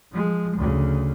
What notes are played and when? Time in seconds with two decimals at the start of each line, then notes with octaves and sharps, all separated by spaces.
0.12 F3 G#3
0.57 D2 C#3